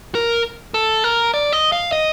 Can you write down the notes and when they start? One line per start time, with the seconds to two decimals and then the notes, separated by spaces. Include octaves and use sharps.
0.15 A#4
0.74 A4
1.04 A#4
1.34 D5
1.53 D#5
1.72 F5
1.92 D#5